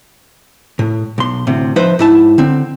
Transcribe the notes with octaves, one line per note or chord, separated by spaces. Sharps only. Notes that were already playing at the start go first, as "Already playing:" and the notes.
A2
B1 C6
D2 A2 C3
F3 D#4 B4 C5 E5
G#2 E4 A5
D3 C4